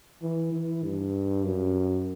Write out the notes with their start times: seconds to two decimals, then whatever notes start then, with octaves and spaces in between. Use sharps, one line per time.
0.22 E3
0.52 E3
0.84 G2
1.45 F#2